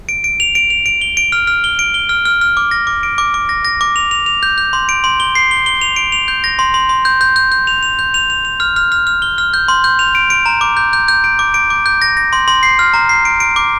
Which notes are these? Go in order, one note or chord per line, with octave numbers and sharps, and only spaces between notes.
D7
D7
F7
D7
F7
D7
G7
D7
F6
F6
G7
D7
G7
F6
F6
F6
D6
A#6
D6
D7
D6
D6
A#6
A#6
D6
F7
F7
F7
G6
G6
C6
D7
C6
G7
C7
G7
G7
F7
D7
F7
G6
A#6
C6
C6
C6
G6
G6
G6
G6
F7
F7
G6
F7
F7
F7
F6
F6
F6
F6
G7
F6
G6
C6
G6
F7
D7
D7
A#5
D6
G6
G6
G6
D7
D6
D7
D6
G6
A#6
A#6
C6
C6
C7
F6
A#5
C7
D7
D7
D6